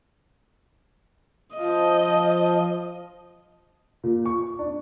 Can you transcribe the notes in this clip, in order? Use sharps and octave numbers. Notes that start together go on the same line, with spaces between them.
F3 D#5
A#2
C#6
D4